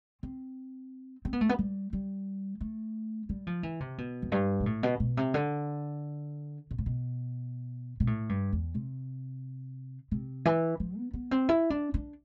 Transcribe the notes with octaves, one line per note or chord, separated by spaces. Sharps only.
C4
C4
B3
A3
B3
G3
G3
A3
G3
F3
E3
C3
B2
F2
G2
B2
A2
B2
B2
C3
D3
B2
A2
B2
B2
A2
G2
E2
C3
C3
E3
F3
B3
B3
C4
E4
D4
D4